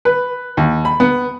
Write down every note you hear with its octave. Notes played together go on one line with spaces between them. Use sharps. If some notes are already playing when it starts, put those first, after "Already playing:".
B4
D#2
B5
B3